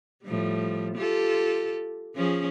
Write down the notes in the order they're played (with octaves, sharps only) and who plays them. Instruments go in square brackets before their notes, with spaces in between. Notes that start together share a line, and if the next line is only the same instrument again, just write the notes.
[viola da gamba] A2 F3 G3
F4 G4 A4
F3 C#4 G#4